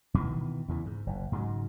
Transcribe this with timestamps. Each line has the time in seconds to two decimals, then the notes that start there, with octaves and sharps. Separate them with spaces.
0.14 B2 D#3 E3
0.68 E2 C#3 E3
0.86 G#2
1.07 F#1
1.32 G#2 C#3 F#3